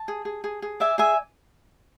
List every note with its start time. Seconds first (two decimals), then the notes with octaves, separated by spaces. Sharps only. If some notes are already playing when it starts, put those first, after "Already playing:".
Already playing: A5
0.08 G#4
0.25 G#4
0.44 G#4
0.62 G#4
0.80 D5 E5 G#5
0.98 G#4 E5 G#5